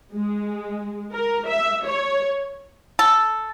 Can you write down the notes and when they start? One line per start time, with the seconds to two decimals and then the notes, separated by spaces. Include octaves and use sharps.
0.12 G#3
1.13 A#4
1.47 E5
1.85 C#5
2.99 A4